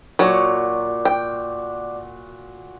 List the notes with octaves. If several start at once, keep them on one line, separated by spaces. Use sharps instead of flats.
A#2 F#3 F#4 C#5 D5 D6
G5